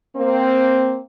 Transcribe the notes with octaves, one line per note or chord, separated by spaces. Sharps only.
A#3 C4